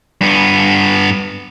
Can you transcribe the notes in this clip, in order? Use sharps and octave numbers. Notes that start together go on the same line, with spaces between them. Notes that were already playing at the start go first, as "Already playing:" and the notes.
G2 B3